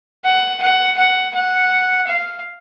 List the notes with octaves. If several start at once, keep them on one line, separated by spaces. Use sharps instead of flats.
F#5
F#5
F#5
F#5
F5